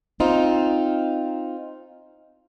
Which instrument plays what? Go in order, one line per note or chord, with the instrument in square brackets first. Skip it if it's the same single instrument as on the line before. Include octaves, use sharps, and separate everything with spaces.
[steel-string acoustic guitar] C4 D#4 F4